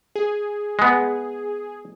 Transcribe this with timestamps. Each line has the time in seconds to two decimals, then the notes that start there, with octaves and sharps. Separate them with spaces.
0.16 G#4
0.79 G#3 B3